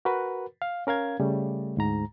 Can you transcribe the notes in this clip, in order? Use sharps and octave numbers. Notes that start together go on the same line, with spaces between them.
F#4 A#4 B4
F5
C#4 A#4 F5 G#6
C#3 G3 A3
D2 G#2 A#5